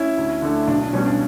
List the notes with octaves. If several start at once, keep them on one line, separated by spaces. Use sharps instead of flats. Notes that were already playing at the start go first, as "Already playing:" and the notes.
Already playing: C#4 E4
D2
D3 A3
B1 D4
D4
B2 G3 C#4
D4